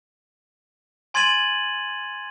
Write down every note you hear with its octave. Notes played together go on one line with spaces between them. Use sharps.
G#5 C6 G#6 A6 D#7 F#7